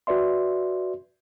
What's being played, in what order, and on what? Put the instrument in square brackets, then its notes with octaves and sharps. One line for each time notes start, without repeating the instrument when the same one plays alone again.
[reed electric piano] F#4 B4 D5 E5 C6